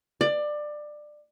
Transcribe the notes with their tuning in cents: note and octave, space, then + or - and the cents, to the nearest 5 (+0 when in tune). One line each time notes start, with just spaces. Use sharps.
D5 +20